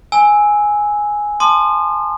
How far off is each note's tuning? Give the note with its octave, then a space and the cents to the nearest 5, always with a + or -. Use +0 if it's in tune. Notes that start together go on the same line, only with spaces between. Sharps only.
G#5 +0 E6 -15
A5 +0 C6 +0 D#6 -40